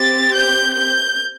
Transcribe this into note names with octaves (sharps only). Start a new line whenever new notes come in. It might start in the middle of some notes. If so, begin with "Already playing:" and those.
Already playing: C4 G4 A6
G6
G6